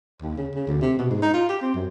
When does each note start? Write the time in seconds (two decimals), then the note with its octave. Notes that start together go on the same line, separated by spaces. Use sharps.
0.22 D#2
0.37 C#3
0.55 C#3
0.67 D2
0.82 C3
0.99 B2
1.10 G#2
1.22 D#4
1.33 F4
1.49 G4
1.61 C4
1.74 F#2